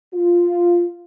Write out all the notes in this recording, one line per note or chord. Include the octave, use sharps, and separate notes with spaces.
F4